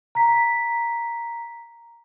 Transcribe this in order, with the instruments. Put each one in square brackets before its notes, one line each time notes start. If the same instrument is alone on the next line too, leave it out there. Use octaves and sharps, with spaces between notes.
[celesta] A#5 B6